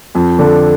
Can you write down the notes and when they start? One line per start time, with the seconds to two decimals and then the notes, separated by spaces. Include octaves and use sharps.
0.15 F2
0.39 D3